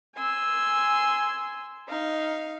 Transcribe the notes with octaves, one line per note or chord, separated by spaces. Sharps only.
G#5 C6 E6
D#4 F5